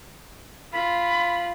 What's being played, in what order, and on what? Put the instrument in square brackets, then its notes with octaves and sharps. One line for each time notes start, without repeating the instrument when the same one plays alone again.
[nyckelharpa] F4 [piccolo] B5